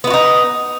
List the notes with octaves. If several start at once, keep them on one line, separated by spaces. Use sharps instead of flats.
B3 D#4 E4 F#4